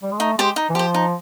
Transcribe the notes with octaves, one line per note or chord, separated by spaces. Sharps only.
G3
G#3
A3 D#4
G#3 G4 C5
D#4
E3
F3 G4 C5
D#4